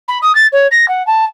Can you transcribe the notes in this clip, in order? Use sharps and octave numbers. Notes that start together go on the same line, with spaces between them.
B5
D#6
A6
C#5
A#6
F#5
A5